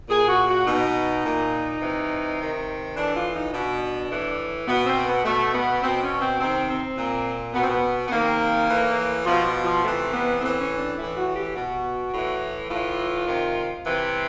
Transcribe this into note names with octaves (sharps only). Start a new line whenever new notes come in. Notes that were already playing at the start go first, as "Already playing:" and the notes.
A#2 G#4
F#4
F#4
B2 D#4
A#2
C3 E3
C3 D#3
A2 E3 D4
F4
D#4
B2 D4
A2 E3
B2 B3
C4
B3
B2 A3
B3
B2 C4
C#4
C4
C3 D#3 C4
C4
A#2
B2 B3
C4
B3
B3
C3 D#3 A#3
A2 E3
B2 F3
F3
F3
C3 E3 A3
B3
A2 E3 C4
C#4
D4
A2 E3 E4
F#4
G4
B2 F#4
A2 E3
A2 E3 F4
C3 D#3
C3 E3